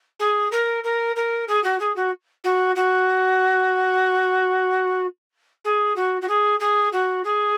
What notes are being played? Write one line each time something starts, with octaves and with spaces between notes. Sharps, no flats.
G#4
A#4
A#4
A#4
G#4
F#4
G#4
F#4
F#4
F#4
G#4
F#4
F#4
G#4
G#4
F#4
G#4